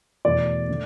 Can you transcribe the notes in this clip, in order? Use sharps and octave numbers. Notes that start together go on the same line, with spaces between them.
E2 B2 A3 D5
D3 A3